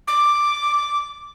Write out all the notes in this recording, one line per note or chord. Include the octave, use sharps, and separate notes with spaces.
D6